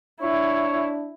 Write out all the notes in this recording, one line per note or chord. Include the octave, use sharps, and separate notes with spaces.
D4 E4 C#5